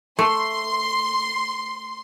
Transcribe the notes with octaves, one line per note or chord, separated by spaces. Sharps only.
A3 C6